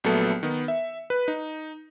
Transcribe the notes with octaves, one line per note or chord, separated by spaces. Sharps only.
A#1 F#3 A3 B3 A4 C#7
D#3 B3
E5
B4
D#4